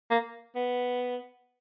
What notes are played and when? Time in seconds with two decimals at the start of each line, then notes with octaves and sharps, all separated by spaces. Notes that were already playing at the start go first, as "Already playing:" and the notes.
0.11 A#3
0.55 B3